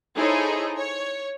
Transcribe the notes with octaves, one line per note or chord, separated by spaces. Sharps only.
D#4 E4 G#4 A4 C5 C#5
C#5